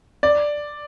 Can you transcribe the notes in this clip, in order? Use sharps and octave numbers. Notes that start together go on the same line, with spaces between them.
D5